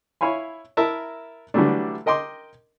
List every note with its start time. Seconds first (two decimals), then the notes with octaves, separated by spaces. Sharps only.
0.21 E4 C#5 F5 G#5 B5
0.77 E4 A#4 E5 A5 A#5
1.54 D3 E3 F#3 G3 A3 D4
2.06 A#4 D#5 G5 C6 D6